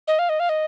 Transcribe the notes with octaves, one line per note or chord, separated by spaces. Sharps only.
D#5
F5
D#5
F5
D#5